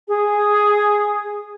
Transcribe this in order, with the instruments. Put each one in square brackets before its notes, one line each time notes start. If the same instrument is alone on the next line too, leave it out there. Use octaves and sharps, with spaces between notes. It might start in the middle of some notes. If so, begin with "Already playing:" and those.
[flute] G#4